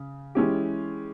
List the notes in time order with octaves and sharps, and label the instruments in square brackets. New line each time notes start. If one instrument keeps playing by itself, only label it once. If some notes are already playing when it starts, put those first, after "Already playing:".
Already playing: [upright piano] C#3
E3 G#3 C#4 G4